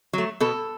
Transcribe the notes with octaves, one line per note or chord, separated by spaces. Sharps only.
F#3 A3
B2 A4